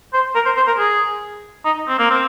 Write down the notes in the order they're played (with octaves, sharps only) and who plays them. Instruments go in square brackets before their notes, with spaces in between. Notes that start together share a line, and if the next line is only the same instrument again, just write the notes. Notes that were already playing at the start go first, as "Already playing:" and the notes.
[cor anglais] C5
A#4
C5
C5
A#4
G#4
D#4
C4
A#3
C4